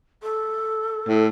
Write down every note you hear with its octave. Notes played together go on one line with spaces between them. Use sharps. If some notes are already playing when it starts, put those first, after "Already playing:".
A4
A2